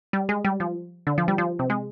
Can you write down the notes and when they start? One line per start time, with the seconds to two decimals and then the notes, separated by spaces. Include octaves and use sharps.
0.13 G3
0.29 G#3
0.45 G3
0.60 F3
1.07 D3
1.18 F3
1.28 G3
1.38 F3
1.59 C3
1.70 G#3